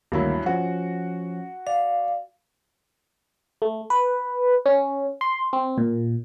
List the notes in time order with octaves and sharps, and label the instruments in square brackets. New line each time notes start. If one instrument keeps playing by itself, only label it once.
[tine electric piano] D2 D#3 A#3 [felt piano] G2 F#3 E4
[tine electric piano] F3 C#4 [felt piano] F#4
[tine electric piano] D5 [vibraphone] F5
[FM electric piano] A3
B4
C#4
C6
C4
A#2